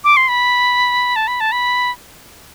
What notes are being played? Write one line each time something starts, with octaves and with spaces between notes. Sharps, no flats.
D6
C6
B5
A5
B5
A5
B5